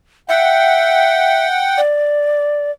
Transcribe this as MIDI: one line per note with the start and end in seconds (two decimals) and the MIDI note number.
0.29 1.47 76
0.29 1.81 78
0.29 1.81 79
1.78 2.71 74